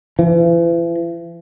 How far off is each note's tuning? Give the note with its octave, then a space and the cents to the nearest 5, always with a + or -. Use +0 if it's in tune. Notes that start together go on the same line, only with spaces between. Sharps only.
E3 +40